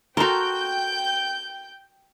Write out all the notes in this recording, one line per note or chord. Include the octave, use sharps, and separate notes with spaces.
F#4 A4 A#4 G5 A#5 C6 G6